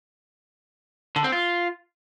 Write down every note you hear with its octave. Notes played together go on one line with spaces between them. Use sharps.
D3
C4
F4